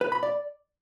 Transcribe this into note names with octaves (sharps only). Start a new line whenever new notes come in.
B4
B5
D5